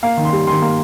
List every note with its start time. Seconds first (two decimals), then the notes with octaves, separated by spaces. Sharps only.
0.03 A#3 F5
0.17 D#3
0.25 C6
0.33 G3
0.47 D#3 C6
0.62 A#3